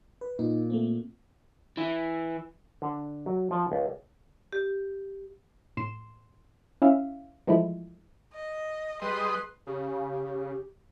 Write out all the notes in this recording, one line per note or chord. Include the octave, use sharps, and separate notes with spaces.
B4
A#2 D#4
A3 A#3 C4
E3
D3
F#3
F3
C#2
G4
A2 C6 E7
C#4 E4 E5 F5
E3 F3 G#3 A3 E4
D#5
G3 G#4 B4 D#5 C6
C#3 G4